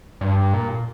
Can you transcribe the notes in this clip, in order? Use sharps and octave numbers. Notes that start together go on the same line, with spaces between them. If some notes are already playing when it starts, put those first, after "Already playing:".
G2
A#2